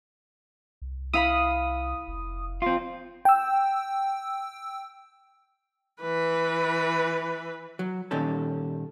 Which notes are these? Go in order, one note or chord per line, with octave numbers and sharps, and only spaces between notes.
C2
E4 F5 B5 D#6
F1
C4 F4
G5 E6
E3 B4
F#3
A#2 D#3 G3 C#4 A4